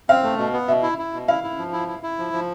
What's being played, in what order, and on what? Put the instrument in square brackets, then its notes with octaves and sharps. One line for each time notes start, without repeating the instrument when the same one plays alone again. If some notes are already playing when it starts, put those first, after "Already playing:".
[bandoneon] C4 [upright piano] F5
[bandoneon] A3
B2
B3
[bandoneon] B2 [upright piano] E5
[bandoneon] E4
E4
B2
[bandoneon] E4 [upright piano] F5
[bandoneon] E4
F3
E4
E4
E4
F3
F3